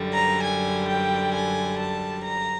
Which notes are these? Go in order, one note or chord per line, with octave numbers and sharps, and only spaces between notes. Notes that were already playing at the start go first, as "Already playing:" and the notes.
Already playing: F#2 D3 G3
A#5
G#5
G5
G#5
A5
A#5